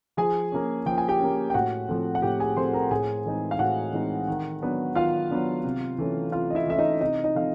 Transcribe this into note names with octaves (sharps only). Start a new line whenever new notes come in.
F3 G#4 G#5
A#3 C#4
F3 G5
G#5
G4 G5
A#3 C#4
G5
A2 F#4 F#5
F3 A3 C4
F#5
A2 G4 G5
G#4 G#5
F3 A3 C4 C5 C6
A#4 A#5
A2 G#4 G#5
E3 G#3 C4 D#4
F5
A2 F#4 F#5
E3 G#3 C4 D#4
D#3
F#3 B3 D4
D#3 F4 F5
F#3 B3 D4
C3
E3 A3 C#4
C3 F4 F5
D#5
E4 E5
E3 A3 C#4 E5
D#4 D#5
C3 D#4 D#5
D#4 D#5
F3 A3 C4 F5